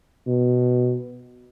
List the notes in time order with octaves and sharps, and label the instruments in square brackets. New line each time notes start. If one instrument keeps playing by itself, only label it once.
[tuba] B2